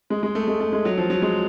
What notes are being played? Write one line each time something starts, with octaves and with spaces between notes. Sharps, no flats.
G#3
G#3
A3
G#3
A3
G#3
F#3
F3
F#3
G#3